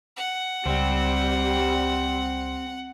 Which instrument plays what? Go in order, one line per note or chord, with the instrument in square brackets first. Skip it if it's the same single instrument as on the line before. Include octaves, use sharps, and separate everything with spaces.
[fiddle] F#5
[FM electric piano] C#2 [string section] G3 [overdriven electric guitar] C4